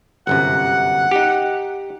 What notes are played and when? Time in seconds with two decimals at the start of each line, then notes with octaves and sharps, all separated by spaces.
0.27 G1 F#2 C3 F#5
1.11 D#4 G4